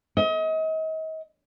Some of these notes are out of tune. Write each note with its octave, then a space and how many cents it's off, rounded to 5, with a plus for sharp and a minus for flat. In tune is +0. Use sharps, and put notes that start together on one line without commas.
D#5 +35